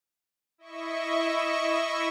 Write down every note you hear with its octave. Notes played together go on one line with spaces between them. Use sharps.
E4 D#5 E5 C#6